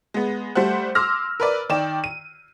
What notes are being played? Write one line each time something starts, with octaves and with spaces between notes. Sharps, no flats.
G#3 B3
G3 A3 C5 F#5
C6 D6 E6 F6 A#6
A#4 B4 D5
D#3 D5 G5 E7
D#7